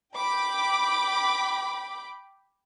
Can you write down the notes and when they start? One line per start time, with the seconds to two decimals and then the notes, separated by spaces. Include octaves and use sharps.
0.16 G5 B5 D6